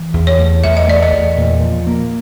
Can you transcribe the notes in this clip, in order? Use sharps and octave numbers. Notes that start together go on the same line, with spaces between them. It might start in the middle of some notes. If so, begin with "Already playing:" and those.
Already playing: E3
E2
C#5
A3
E2 E5
D#5
A3 D5
D#5
E2
A#2
F3
A#3